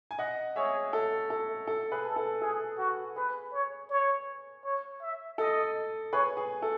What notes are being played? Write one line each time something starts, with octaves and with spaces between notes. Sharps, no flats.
G#5
D#5 F#5
G#4 C#5 E5
A4
A4
A4
G#4 B4
A4
A4
G#4 A4
F#4
G#4 B4
C#5
C#5
C#5
E5
A4 D#5
G#4 B4 C#5
G#4
A4